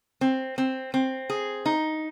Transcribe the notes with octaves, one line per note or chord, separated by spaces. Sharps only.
C4
C4
C4
G#4
D#4